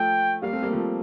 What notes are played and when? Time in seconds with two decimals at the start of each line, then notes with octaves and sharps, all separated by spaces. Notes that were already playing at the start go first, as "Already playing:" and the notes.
Already playing: F3 A3 G5
0.42 G3 A#3 F5
0.52 A3 C4
0.62 G3 A#3
0.72 F3 A3